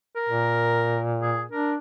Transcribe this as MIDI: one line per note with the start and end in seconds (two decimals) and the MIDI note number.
0.16 1.01 70
0.29 1.46 46
1.22 1.42 68
1.52 1.77 62
1.52 1.73 70